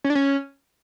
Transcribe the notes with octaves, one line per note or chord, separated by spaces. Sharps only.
C#4
D4
C#4